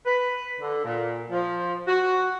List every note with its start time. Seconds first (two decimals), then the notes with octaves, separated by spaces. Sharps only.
0.06 B4
0.61 D3
0.84 A#2
1.31 F3
1.87 F#4